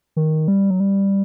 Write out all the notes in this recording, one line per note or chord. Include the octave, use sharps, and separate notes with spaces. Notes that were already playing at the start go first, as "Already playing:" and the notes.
D#3
G3
F#3
G3